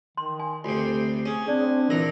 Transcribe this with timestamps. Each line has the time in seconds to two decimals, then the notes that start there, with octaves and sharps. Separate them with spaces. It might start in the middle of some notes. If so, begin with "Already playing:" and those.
0.17 D#3 C6
0.39 G#5
0.64 D2 C3 F4 G4
1.26 C#4 G#4
1.48 C4 D4 D5
1.90 A#1 D#3 E3 A#4 A#5